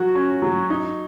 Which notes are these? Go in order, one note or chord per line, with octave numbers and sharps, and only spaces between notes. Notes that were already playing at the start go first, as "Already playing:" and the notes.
Already playing: F#3 F#4
C#4
F#3
D#4